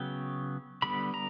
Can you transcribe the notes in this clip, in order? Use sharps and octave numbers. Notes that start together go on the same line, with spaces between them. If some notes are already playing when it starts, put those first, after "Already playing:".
Already playing: C#3 F#3 B3 G5
D3 G3 B3 B5
A#5